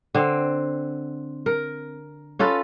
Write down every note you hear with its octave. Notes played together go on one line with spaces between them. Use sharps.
D3 C4
A#4
C#4 F4 A4 B4